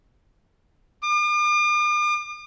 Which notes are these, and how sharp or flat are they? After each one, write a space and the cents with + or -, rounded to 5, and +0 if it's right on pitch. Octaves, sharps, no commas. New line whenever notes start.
D6 +45